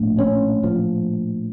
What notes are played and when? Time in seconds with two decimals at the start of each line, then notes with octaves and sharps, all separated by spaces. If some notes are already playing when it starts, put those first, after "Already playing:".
Already playing: A#1 A2
0.18 C#4
0.63 F3